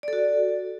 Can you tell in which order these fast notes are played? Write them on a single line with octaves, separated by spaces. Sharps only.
D5 A4 F#4